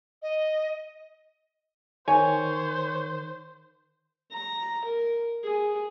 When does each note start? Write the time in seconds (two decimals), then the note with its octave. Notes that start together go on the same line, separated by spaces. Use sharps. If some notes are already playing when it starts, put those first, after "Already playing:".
0.22 D#5
2.08 D#3 C5 C#5 G#5
4.32 A#5
4.85 A#4
5.44 G#4